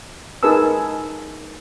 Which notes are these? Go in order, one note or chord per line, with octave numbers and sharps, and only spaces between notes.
D#4 G#4 A#4 B4 A5 E6